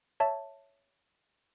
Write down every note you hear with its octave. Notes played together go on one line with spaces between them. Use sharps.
C#5 E5 A5